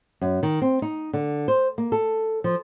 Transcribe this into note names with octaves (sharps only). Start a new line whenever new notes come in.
F#2
D#3
C4
D#4
D3
C5
A#3
A4
F3